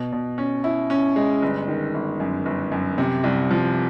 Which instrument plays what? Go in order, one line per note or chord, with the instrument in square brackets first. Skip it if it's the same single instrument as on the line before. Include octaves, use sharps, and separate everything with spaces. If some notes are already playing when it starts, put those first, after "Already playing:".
Already playing: [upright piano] B2
B2
C#4
E4
C#4
G#3
G1
D#3
G1
F#2
G1
F#2
C3
C2
F3